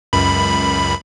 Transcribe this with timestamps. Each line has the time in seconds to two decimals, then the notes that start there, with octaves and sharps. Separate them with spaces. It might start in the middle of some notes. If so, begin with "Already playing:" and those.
0.13 C#2 F#2 B5